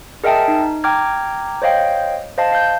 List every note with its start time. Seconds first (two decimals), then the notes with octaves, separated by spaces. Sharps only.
0.24 G#4 A#4 D#5 E5 G5 A5
0.48 D#4
0.84 G5 A#5 D6 F6 G#6
1.62 C5 C#5 D#5 F5 G5
2.38 C5 D#5 F5 A5
2.52 F5 G6